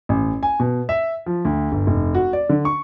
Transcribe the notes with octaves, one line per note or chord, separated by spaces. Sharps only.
A1
G#5
B2
E5
F3
D2
G1
F1
F#4
D5
D3
C#6